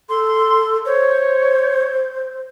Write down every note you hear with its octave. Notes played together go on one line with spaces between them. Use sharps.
A4 C6
C5 C#5